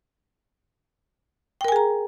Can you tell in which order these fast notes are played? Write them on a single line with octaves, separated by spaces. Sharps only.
G5 A#4 G#5 G#4 A#5